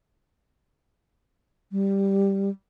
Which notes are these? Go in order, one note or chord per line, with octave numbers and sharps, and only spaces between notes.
G3